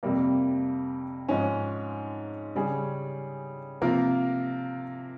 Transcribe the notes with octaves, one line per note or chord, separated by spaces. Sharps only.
F2 C3 G3 A#3
G#2 F3 G#3 C#4
C#3 G3 C#4 G#4
C3 F3 A#3 F4 A#4